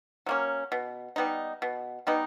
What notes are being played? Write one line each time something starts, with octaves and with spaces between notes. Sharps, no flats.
F#3 A#3 C#4
B2
G3 B3 D#4
B2
G3 B3 D#4